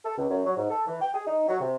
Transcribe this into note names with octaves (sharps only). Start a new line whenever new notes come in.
A4
C#2
F#2
F#3
G#2
A4
E3
G5
G#4
D#4
F#3
C3